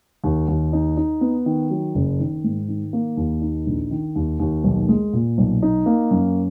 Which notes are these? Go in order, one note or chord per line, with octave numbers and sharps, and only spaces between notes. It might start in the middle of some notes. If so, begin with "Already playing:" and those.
D#2
D#2
D#4
D#4
B3
D#3
F#3
F#1
D#3
G#2
D#3
A#3
D#2
D#4
A#1
D#3
D#2
D#2
B1
G#3
A#2
B1
D#4
A#3
F#2